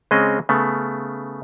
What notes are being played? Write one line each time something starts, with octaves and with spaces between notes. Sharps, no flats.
C#3 G#3 C4 C#4 D#5
C#3 A3 B3